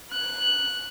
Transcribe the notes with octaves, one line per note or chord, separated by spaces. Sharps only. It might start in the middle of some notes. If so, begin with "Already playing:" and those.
F#6